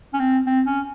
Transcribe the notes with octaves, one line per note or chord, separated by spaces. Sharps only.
C#4
C4
C4
C#4